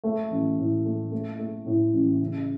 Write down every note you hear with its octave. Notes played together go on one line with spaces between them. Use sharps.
A3
A1
A2
A3
A3
A3
A2
A1
C#3